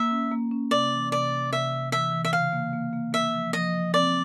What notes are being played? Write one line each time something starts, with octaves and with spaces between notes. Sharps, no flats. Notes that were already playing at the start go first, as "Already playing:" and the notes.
Already playing: A#3 E5
C#4
A#3
C#4
C3 D5
E3
C3 D5
C3
C3 E5
C3
E3 E5
E3
E5
C#3 F5
A#3
A#3
A#3
A#3 E5
F3
F3 D#5
F3
C4 D5